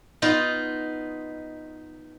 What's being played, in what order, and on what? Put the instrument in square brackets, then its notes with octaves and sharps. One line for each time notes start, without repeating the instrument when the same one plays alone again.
[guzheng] B3 D#4 F4